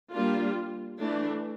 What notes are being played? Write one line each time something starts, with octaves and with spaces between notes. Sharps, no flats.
G3 A#3 D4 F4
E3 A3 D4